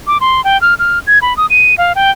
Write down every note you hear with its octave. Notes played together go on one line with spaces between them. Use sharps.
D6
C6
G5
F6
F6
G#6
B5
D#6
D#7
F5
G5